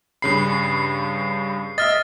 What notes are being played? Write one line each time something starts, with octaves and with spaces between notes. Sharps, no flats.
G2 C#3 B5 C7
D#5 E5 F6 A6